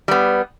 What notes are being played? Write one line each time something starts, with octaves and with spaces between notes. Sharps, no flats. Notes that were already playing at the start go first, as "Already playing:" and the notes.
G3 B3